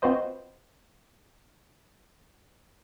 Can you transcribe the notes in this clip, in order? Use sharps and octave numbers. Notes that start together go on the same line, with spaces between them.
C4 F4 F#4 B4 C5 D#5